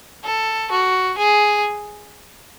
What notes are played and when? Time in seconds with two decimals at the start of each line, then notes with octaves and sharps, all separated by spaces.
0.24 A4
0.71 F#4
1.18 G#4